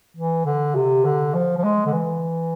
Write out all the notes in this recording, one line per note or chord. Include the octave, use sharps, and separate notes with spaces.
E3
D3
C3
D3
F3
F3
G#3
D3
E3